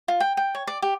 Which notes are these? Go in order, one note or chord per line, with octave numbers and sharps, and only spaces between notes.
F4
G5
G5
C#5
D5
G4